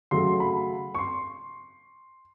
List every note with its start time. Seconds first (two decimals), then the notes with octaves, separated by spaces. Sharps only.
0.11 C#3 F#3 A3 C6
0.40 B5
0.95 C#6
0.98 C6